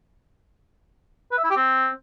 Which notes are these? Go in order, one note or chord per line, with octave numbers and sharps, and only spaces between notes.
B4
E5
E4
G4
C4